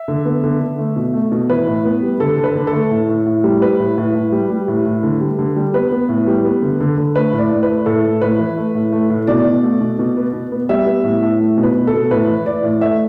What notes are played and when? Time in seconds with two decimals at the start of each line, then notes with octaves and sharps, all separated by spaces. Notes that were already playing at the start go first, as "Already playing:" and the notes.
Already playing: E5
0.08 D3
0.25 B3
0.44 D3
0.61 D3
0.79 A3
0.96 B2
1.14 A3
1.32 B2
1.49 E3 B4
1.67 A2
1.85 B3
2.02 G3
2.20 D3 A4
2.37 D3
2.44 B4
2.55 D3
2.67 A4
2.73 A3
2.91 A2
3.09 A2
3.26 A2
3.44 G3
3.61 G3 B4
3.80 A2
3.98 A2
4.15 A2
4.32 G3
4.50 G3
4.68 A2
4.86 A2
5.03 D3
5.21 G3
5.39 D3
5.56 G3
5.74 B3 B4
5.91 B3
6.09 A2
6.27 G3
6.44 B3
6.62 D3
6.81 D3
6.98 D3
7.15 A3 B4
7.33 A2
7.38 D5
7.51 A2
7.63 B4
7.68 A3
7.86 A2 A4
8.04 A2
8.21 A2 B4
8.39 E3
8.57 A3
8.75 A2
8.92 A3
9.10 A2
9.27 B2 D5
9.46 B2
9.64 A3
9.81 B2
9.99 B2
10.17 B3
10.33 B2
10.52 B3
10.69 G3 E5
10.86 B3
11.04 A2
11.22 A2
11.40 A3
11.57 B2
11.63 B4
11.75 B2
11.87 A4
11.93 B2
12.11 A2 B4
12.29 E3
12.46 E3 D5
12.64 A2
12.81 A3 E5